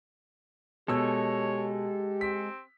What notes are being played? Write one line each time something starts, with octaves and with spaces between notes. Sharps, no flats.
B2 G#3 G4 A4 C#5 E6
C4 B6